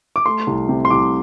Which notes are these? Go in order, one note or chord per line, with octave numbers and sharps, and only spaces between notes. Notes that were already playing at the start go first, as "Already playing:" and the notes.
D6
A3 C6
C2
C3
C6
C2 D6